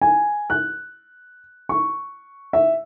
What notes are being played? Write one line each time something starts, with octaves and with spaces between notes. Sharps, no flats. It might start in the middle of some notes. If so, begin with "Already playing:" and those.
G#5
F#6
C#6
E5